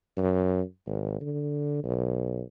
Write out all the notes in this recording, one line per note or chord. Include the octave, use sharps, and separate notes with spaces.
F#2
G#1
D3
B1